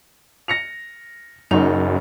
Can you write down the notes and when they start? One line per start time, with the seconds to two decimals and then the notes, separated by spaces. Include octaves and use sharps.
0.48 A#6 C#7 F7
1.51 F#1 F#2 D#4 F7